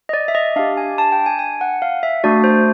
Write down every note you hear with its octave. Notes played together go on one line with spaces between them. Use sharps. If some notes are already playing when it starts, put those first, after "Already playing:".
D#5
D5
E5
D#5
D4 G4 F5
G#5
A5
G5
G#5
G#5
F#5
F5
E5
A3 D4 F#4 D5
C5